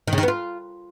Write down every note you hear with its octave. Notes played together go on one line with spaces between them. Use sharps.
D#3
C#3
D#3
B3
F4